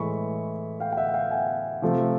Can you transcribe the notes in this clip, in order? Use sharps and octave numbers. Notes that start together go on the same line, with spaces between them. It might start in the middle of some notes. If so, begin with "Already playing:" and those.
Already playing: A2 E3 G#3 B5 C#6
F5 G5
G5
E5 F#5
F5 G5
F#5 G#5
C3 F3 A3